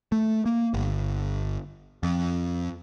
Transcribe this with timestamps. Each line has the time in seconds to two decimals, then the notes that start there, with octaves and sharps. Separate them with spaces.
0.12 A3
0.46 A#3
0.74 G1
2.03 F2